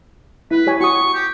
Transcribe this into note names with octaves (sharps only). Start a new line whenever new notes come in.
E4 B4
G4 C#5 G#5
F#4 C#6 D#6
G4